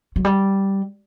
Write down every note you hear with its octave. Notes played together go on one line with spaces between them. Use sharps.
F#3
G3